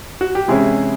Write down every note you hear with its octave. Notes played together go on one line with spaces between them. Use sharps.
F#4
G4
C3 E3 G#3 C#4 E4 G#4